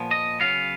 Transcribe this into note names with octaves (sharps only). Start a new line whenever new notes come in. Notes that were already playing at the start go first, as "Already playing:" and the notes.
Already playing: A#2 F3 B3
D#5
C#3 F#3 B3 F5